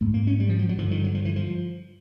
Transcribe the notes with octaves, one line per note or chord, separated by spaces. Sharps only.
G#2 A3
A#3
C#4
G3
F3
F#3
F#3
G2 D3 F3
D#3
F#3
F3
E3
F3